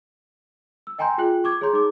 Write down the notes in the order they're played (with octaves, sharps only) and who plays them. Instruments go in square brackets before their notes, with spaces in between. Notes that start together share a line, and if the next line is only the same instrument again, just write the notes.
[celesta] E6
D#5 G5 G#5 A#5 C6 G6
F4 G#4 G5 F#6 F#7
C#6 D6 G#6
G#4 C#5 A#5 C6 G6
D#4 G#4 D6